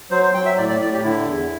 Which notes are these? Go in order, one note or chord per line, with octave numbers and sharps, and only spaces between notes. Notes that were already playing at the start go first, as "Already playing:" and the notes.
F#3 C5
C5
F#3 G5
E5
A2 D5
D5
A2 D5
G4
D3 E4
E2